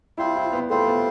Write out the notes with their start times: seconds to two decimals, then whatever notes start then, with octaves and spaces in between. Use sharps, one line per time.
0.18 G3 C4 E4 F4 C5
0.36 E4
0.53 B3
0.70 G3 A3 C4 F4 C5
0.87 B3